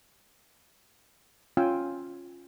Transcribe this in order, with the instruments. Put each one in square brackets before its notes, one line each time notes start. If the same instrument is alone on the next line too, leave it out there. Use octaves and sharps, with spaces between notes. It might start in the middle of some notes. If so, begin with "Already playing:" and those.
[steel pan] C#4 F4 G5 G#5 E6